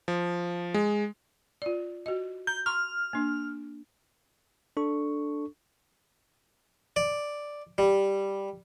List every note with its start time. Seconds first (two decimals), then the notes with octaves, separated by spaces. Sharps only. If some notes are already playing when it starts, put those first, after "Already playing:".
0.08 F3
0.74 G#3
1.62 F4 D5
2.06 F#4 D#5
2.47 A#5 G6
2.66 A#5 C6 C#6 F6
3.13 A#3 D4
4.77 D4 A4 C#6
6.96 D5
7.78 G3